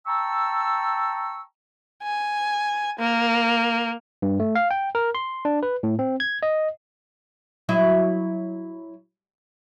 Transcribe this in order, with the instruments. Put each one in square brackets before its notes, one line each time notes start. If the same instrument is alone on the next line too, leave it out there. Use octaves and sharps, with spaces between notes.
[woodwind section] G5 A5 A#5 C#6 E6
[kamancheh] G#5
A#3
[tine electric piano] G2
A3
F5
G5
A#4
C6
D4
B4
A2
C4
G#6
D#5
[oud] F#3 E4 D#5